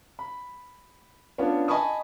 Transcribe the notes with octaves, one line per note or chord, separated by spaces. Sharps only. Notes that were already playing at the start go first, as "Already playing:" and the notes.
B5
B3 C#4 D4 F4
D#5 G#5 A5 B5 C#6 D#6